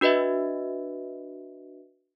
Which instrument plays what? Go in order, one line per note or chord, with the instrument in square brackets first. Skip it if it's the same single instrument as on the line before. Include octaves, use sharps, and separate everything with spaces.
[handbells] D4 F#4 B4 D#5 E5